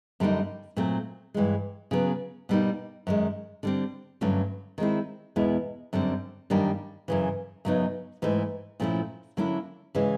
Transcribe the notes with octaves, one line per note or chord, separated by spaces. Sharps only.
F#2 D3 G3 A#3 D#4
A#2 F#3 A3 C4
G2 E3 G#3
C#3 F#3 B3
B2 G3 A#3 D#4
F#2 D#3 G#3
D3 G3 C4
G2 D3 F#3 A3 C#4
D#3 G#3 C4 E4
E2 B2 G#3 B3 E4
F#2 D3 G3 C4
F#2 D#3 G3 A#3 D4
F#2 C#3 E3
F#2 C#3 F#3 B3 D#4
G#2 E3 A3
A#2 F3 A3 C#4 E4
D3 F#3 A#3 C#4 E4
C#3 E3 G#3 C#4